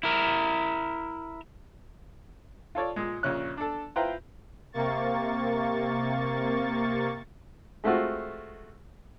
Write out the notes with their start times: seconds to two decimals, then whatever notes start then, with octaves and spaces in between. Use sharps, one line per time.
0.03 E4 A#4
2.75 F4 A4 C#5 D5
2.96 A#2 G#3
3.23 A#1 A#2 C#3 C#4 F#6
3.57 D4 A4
3.96 E4 F4 B4 C5 G5 A#5
4.72 C3 A#3 C#6 A6
7.84 G#3 A3 C4 F4 F#4